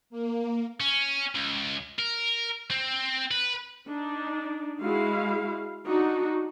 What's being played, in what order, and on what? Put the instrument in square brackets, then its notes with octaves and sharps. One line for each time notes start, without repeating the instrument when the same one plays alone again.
[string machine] A#3
[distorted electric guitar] C#4
C#2
A#4
C4
B4
[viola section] D4 D#4
G#3 E4 F#4 F5
D4 D#4 F#4